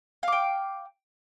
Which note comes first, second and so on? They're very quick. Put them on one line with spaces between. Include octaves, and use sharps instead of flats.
F5 D6 G5